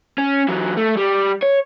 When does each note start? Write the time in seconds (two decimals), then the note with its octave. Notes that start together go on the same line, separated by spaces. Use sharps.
0.18 C#4
0.48 E2 F#3
0.77 A3
0.97 G3
1.42 C#5